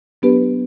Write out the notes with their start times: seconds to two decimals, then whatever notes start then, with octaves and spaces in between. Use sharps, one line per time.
0.22 F#3 B3 D4 G4 B4